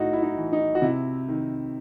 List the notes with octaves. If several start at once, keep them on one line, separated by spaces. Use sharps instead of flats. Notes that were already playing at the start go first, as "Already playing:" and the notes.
Already playing: A2 D#4 E4 F#4
E4
D#4
E3
D#4
F#4
C3 E4
D#3